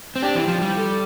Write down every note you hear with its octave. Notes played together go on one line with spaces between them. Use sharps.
C4
D4 G4
E3
F3
G3
A4